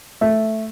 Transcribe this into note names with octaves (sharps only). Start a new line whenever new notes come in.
A3